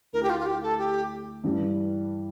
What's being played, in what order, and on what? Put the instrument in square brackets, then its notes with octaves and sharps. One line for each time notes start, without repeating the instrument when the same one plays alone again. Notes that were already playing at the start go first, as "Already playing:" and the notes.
[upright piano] D2 D3 A3 E4 [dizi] A#4
[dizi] G4
F4
F4
G4
A4
G4
[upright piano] G2 E3 G3 D4